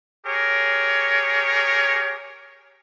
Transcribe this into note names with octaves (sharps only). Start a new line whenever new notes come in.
G4 G#4 A#4 C#5